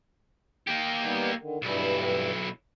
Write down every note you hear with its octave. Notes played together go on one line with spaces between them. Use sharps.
A#3 G4
G3 B3 D#4
D3 D#3
B1 G2 E3 G3 E4